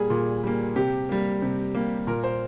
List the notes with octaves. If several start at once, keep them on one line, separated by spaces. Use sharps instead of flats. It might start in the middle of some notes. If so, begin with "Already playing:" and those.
Already playing: A#2 G3 A#3 G#4
A#2
G3 A#3
C3 G4
G3 A#3
C3
G3 A#3
A#2 A#4
C5